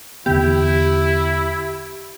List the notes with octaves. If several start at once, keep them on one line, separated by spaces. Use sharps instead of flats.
E2 D3 B3 E4 G4